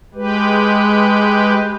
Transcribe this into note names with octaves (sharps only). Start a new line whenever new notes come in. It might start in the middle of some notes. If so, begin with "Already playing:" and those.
G#3 G4 B4